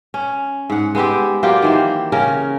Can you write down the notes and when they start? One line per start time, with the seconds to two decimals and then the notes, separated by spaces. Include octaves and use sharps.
0.14 C#4
0.70 G#2 F#5
0.95 G#3 B3 C4 G4
1.43 F#3 A#3 F4 G4
1.62 D#3 E3 C5
2.12 C#3 C#4 A#4